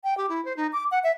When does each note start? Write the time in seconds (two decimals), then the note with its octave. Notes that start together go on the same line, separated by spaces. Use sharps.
0.04 G5
0.17 G4
0.29 E4
0.45 C5
0.57 D#4
0.73 D6
0.91 F#5
1.04 E5